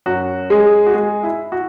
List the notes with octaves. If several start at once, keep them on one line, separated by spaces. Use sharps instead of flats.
F#2 F#3 F#4
G#3 G#4
F#4
G#3 G#4
E4
F#4